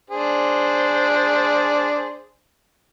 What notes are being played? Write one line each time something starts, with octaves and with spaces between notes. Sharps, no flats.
D4 G#4 C5